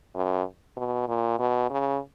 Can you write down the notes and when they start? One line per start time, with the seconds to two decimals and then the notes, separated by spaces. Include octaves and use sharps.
0.15 F#2
0.77 B2
1.08 A#2
1.39 B2
1.70 C#3